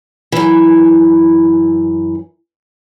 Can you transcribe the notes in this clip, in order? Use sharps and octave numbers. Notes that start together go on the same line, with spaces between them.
F#2 E3